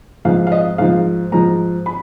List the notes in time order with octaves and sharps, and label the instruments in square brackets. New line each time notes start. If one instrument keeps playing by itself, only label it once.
[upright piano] G#2 F3 F5
F5
D#5
G#2 F3 F5
G#2 F3 A#5
B5